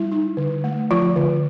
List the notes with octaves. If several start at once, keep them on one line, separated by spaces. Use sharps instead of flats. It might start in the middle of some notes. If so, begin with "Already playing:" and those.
Already playing: G3 E4
D#4
D3
A3
F3 F4
D3